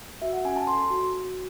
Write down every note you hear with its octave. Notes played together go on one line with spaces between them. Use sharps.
F#4 E5
F#5
C#4 G#5
A5
A4 C6
F#4
F#4